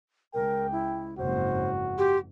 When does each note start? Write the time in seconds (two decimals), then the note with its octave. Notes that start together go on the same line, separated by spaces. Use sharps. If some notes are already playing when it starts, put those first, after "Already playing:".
0.34 C#2 A#4 G5
0.72 E4
1.18 F#1 F2 G#2 F#4 C5
1.98 G4 C6